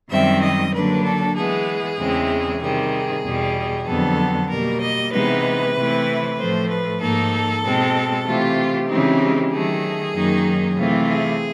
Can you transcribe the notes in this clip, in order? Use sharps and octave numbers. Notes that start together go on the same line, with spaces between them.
F#2 D#3 G3 C4 E5
D#5
D3 F#3 A#3 D4 B4
A4
E3 G#3 B3 G#4
E2 C#3 E3 G#3 C4
C3 D#3 G3 G#4
E2 B2 G3
F2 D3 F#3 B3 A4
B2 G3 A#3 A#4
D#5
C3 E3 G#3 B3 D#4 B4
C3 E3 A3 C4 E4
A2 F3 A3 C5
B4
G#2 F3 A#3 D#4 A4
B2 G#3 C4
C3 E3 A3 C4 F4 G4
C#3 E3 G#3 C4 D#4
D#3 F#3 A3 G#4
F#2 D#3 F#3 A#3 D#4
C3 E3 A3 C4 F4
G#4